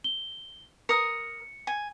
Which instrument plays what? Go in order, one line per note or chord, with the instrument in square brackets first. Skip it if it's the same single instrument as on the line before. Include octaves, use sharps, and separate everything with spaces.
[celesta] G7
[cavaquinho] A#4 D#6 [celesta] C#7
[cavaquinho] G#5